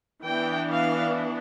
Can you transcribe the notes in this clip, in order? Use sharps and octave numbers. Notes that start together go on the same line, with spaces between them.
E3 B3 D4 G5
F5